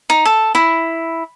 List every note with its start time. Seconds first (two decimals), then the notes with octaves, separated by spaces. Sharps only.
0.10 D#4
0.25 A4
0.55 E4